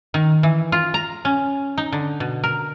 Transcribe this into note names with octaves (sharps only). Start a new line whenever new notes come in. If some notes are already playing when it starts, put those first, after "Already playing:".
D#3
E3
F4
A#5
C#4
D#4
D3
B2
A#4